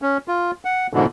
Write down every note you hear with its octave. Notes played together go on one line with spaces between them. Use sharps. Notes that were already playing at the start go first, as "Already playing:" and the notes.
C#4
F4
F#5
G#2 B2 D3 E3